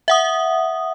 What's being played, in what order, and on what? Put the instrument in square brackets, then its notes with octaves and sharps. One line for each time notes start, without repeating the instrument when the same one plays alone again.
[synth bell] E5 F#5 D#6